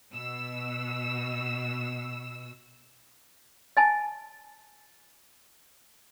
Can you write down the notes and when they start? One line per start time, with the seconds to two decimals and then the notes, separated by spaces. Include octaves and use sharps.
0.13 B2 E6
3.77 D#5 G#5 A5